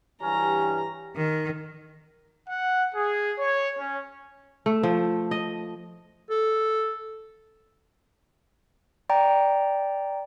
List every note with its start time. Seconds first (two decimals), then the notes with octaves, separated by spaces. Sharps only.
0.22 G2 E3 C#4 G4 A#5
1.17 D#3
2.48 F#5
2.94 G#4
3.38 C#5
3.79 C#4
4.66 A3
4.83 F3
5.31 D#5
6.30 A4
9.09 D5 G5 A#5